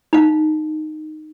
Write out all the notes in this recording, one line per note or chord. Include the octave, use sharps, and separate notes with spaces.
D#4 F5